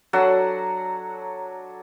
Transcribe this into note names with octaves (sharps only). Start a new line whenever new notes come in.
F#3 D4 A4 F#5